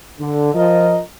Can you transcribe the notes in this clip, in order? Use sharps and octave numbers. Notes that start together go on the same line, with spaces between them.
D3
F3 A#4 D#5